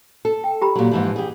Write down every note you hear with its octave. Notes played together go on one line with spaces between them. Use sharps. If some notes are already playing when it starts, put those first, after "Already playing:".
A4
G5
G4 A#5 B5
A#2 F#3
G#2 E3 F3
G4 G#4